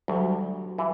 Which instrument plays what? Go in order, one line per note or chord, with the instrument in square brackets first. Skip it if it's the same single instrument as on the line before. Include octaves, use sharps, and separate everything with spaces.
[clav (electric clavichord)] D2 [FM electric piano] F#3 G3
[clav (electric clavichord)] E3